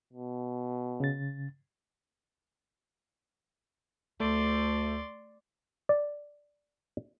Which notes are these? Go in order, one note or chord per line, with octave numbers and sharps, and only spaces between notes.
B2
C#3 A6
D2 A3 D5 C6
D5